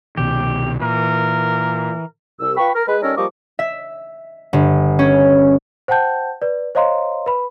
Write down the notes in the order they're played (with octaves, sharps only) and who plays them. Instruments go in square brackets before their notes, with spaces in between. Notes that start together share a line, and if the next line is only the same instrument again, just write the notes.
[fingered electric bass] C2 B2 D#3 [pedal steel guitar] G4
[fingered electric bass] A#2 [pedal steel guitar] E3 [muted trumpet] A#4
[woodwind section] C2 E6
F4 B4 G5 B5 C#6
A#4
G#3 B4
G3 C#4 D#4 A4 A#4 C#5
F3 G3 A#3 D#5 C#6 D6
[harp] E5
G1
C#4
[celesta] C5 F#5 G5 A5 G6
B4 D5
C5 C#5 D#5 F5 A#5 C6
B4 B5